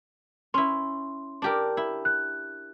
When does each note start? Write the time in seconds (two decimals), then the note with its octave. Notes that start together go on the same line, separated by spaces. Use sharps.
0.54 C#4 E4 C6
1.42 D4 G4 A#4
1.77 E4
2.05 F#6